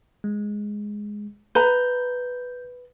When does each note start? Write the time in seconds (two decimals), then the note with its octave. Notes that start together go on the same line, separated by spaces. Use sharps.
0.24 G#3
1.55 B4 A#5 G6